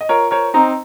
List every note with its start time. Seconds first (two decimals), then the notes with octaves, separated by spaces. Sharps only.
0.01 D#5
0.09 F4 A#4 C#5
0.31 A#4 C5 C#5
0.54 C4 D#4 A#5